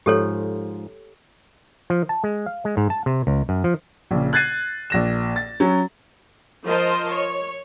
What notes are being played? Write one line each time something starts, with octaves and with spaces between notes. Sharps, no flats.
G#2 F3 G4 A4 C#5
F3
A5
G#3
F5
G#3
G#2
A5
C3
C#2
F#2
F3
A#1 C#3
F#6 G#6 A6 C7 D#7
A#1 A#6 E7
A6
F#3 C#4
F3 A#4 C5 D#5 A5 C6
C#5